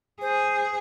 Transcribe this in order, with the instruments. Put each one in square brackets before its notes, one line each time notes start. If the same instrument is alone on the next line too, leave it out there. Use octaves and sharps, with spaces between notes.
[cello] G#4 [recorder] C5